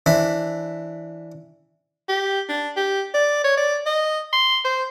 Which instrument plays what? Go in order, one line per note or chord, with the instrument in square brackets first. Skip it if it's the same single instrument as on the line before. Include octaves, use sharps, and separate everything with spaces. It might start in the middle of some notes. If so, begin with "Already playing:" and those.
[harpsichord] E3 D4 C5 B5
[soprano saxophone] G4
D4
G4
D5
C#5
D5
D#5
C6
C5